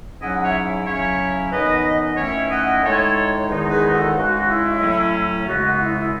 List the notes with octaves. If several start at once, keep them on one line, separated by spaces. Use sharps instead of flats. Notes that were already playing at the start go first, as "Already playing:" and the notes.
G#2 F#3 C#4 E4 D#5 F#5
C#5 E5
C#3 F#3 C#4 E4 C#5 E5
F#2 E3 B3 D#4 B4 D#5
D#3 A3 C#4 E4 C#5 E5
D#5 F#5
A2 G#3 D#4 A4 C#5
E2 D#3 G#3 D#4
G#4 B4
F#4 A4
C#3 G#3 D#4 F#4
E4
A2 F#3 A3 C#4
F#2 C#3 G#3 B3 D#4 F#4
E4
E4